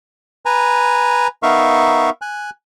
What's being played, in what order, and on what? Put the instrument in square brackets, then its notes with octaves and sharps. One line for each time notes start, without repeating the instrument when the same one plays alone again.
[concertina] B4 G#5 A#5
B3 D#4 A#4 E5 F5 C#6
G#5 F#6